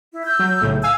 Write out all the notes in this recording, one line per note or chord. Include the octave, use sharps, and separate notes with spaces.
E4
E6 G6
F#3
B1 A2 C#3
F5 G#5 E6